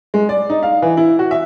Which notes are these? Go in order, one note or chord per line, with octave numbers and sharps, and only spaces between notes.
G#3
D5
D#4
F5
E3
E4
F#4
E5